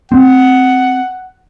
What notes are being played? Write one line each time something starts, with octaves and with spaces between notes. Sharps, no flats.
C4 F#5